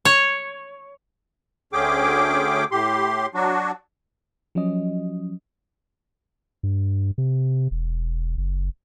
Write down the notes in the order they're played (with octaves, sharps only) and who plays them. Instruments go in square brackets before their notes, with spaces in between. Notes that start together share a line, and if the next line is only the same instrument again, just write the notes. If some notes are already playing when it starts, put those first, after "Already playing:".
[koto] C#5
[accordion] D2 D3 C#4 G#4 G5 D6
A2 G4 C6
F#3 D4 F#4
[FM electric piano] F3 F#3 C#4 D#5
[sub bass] G2
C3
E1
F#1